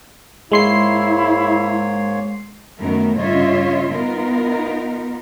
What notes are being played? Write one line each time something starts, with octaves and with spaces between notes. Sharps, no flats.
G#2 G#3 A#3 E4 C#5 C6 C7
F#2 D#3 A3 B3 A#4
G2 C#3 F4 C#5 D#5 E5
B3 D#4 F4 A#4